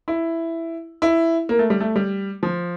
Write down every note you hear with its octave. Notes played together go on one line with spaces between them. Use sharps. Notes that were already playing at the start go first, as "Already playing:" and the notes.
E4
E4
A#3
A3
G3
A3
G3
F3